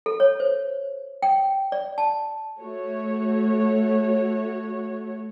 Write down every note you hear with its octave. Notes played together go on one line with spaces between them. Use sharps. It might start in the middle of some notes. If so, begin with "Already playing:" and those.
A4
C#5
C5
G5
D5
A5
A3 F#4 C#5